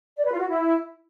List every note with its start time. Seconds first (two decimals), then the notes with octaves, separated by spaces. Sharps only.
0.17 D5
0.24 B4
0.32 F4
0.40 F#4
0.47 E4